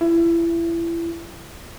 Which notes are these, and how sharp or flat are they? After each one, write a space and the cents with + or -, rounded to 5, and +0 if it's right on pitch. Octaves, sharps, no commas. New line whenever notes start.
E4 +30